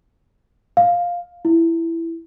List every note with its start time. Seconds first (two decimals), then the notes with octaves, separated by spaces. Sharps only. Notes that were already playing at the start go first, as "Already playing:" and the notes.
0.77 F5
1.45 E4